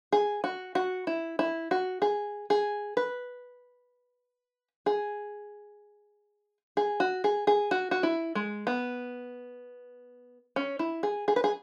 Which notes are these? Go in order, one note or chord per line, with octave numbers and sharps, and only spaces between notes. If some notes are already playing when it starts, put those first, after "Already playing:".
G#4
F#4
F#4
E4
E4
F#4
G#4
G#4
B4
G#4
G#4
F#4
G#4
G#4
F#4
F#4
E4
G#3
B3
C#4
E4
G#4
G#4
B4
G#4